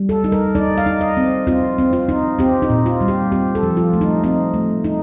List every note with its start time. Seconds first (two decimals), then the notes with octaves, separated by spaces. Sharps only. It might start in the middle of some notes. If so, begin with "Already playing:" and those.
Already playing: G3
0.09 A4
0.24 D#4
0.32 A#4
0.55 D#4 D5
0.78 F5
0.86 D#4
1.01 D#5
1.17 C4
1.47 C4 F4
1.78 C4
1.93 F4
2.09 D#4
2.39 C4 G4
2.62 D#4
2.70 A#2
2.86 F4
3.01 G3
3.08 G4
3.32 C4 G4
3.55 A4
3.63 F3
3.77 F4
3.93 A3
4.01 D#4
4.24 C4 D#4
4.54 A3
4.84 D#4